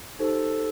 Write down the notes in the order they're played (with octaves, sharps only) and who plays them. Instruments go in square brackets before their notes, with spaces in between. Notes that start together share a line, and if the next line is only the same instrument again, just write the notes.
[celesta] D#4 G4 C5 [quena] A4